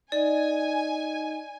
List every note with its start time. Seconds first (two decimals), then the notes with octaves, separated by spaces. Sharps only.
0.12 D#4 D5 D#5 G#5